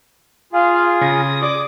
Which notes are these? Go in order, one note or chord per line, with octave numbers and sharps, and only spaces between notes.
F4 G#4 F5
C#3 D#6 A#6
G#4 D5 D6